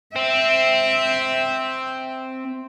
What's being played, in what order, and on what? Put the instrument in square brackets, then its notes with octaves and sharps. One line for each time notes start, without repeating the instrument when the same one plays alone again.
[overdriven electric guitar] C4 [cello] E5 G5